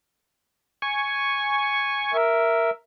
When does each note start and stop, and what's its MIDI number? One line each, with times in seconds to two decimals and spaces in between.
0.82 2.17 80
0.82 2.17 85
2.14 2.70 70
2.14 2.70 76